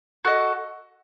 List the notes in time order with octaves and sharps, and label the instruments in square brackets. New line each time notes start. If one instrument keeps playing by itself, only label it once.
[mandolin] F#4 A4 D#5